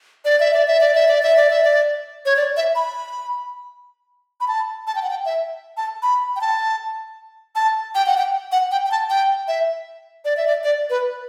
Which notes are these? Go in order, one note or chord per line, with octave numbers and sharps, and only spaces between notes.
D5
E5
D5
E5
D5
E5
D5
E5
D5
E5
D5
C#5
D5
E5
B5
B5
A5
A5
G5
F#5
G5
E5
A5
B5
G5
A5
A5
G5
F#5
G5
F#5
G5
G5
A5
G5
E5
D5
E5
D5
D5
B4